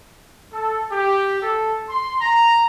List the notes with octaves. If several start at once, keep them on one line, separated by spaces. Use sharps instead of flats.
A4
G4
A4
C6
A#5